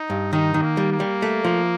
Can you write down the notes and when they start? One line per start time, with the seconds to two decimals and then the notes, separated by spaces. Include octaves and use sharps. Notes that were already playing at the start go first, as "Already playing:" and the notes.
Already playing: D#4
0.10 G2
0.33 D#3 D#4
0.54 D#3
0.62 A#3
0.77 G3
0.92 A#3
1.00 G3
1.22 A3
1.45 F3